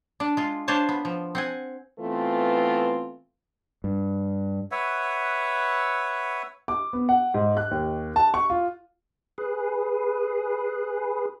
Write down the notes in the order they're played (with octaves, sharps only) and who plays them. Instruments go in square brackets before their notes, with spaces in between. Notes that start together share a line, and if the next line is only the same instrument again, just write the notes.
[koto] D4 D5
G#3 F4
D4 F4 C5 C#5 G#5 A5
B3
F3
C4 F#5 G#5
[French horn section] E3 A3 B3 C4 F4
[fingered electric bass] G2
[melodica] B4 C#5 E5 F#5
[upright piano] D6
B3
F#5
G#2
F#6
D#2
A5
C#6
F4
[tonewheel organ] G#4 B4